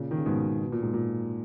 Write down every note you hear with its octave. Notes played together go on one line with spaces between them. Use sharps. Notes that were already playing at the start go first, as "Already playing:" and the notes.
Already playing: A#2 C#3
D#3
C#3
G#2 B2
B2
A#2
G#2
A#2